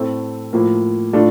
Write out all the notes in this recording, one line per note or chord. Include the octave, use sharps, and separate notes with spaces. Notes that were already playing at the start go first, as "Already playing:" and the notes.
Already playing: A2 A3 C4
A2 F3 A#3
A2 A3 D4 F4